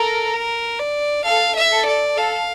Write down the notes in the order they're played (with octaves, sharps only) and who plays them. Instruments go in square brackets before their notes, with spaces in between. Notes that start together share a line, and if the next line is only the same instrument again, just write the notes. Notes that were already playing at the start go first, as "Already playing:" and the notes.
Already playing: [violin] A4 [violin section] A#4
[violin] A#4
D5
[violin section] A4 [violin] F5
[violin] E5
[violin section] A4
[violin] D5
[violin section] A4 [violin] F5